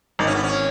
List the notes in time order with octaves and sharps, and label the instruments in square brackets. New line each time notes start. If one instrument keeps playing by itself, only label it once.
[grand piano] G#1 [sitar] D#4
[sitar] C#4
B3
C#4